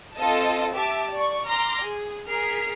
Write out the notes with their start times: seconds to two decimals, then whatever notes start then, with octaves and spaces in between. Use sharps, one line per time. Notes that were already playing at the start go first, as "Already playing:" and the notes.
0.17 C4 F4 A4 D#5 A5
0.74 G4 E5 A5 D6
1.12 D5 C#6
1.47 A#5 C6 D6 F6 A#6
1.81 G#4
2.27 G#4 A#4 F6 B6 C7